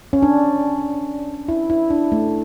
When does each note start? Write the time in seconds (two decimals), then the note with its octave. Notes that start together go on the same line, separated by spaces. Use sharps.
0.13 C#4
0.23 D4
1.49 E4
1.70 E4
1.90 D4
2.12 A3